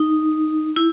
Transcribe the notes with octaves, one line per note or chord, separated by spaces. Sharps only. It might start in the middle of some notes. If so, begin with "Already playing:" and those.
Already playing: D#4
E4